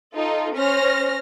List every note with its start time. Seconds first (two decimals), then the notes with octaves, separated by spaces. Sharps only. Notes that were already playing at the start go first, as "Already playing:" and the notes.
0.14 D#4 F4 A4
0.56 C#4 C5 C#5 F6 A#6